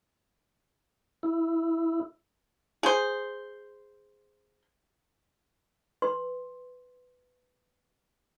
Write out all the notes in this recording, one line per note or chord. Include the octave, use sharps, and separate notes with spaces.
E4
G#4 C5
B4 C6